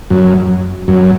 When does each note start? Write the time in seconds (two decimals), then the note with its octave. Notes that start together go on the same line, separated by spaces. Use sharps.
0.10 F#2
0.88 F#2